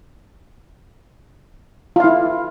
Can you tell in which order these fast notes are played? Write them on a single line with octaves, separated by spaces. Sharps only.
F4 F5 E4